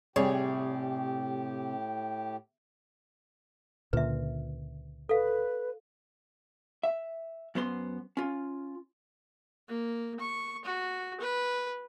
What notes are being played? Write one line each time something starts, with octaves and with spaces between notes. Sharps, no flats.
A2 C3 G3 G4 G#4 C#5
C#2 A#2 D3 B4 E5
A4 B4 F5
E5
F#2 B3 C5 C6
C#4 F4
A#3
C#6
F#4
B4